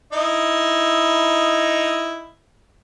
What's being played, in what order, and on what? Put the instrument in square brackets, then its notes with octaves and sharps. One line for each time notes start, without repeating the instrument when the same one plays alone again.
[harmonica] D#4 E4